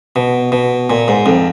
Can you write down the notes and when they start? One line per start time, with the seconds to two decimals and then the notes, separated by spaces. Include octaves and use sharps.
0.16 B2
0.52 B2
0.90 A#2
1.08 G#2
1.26 F2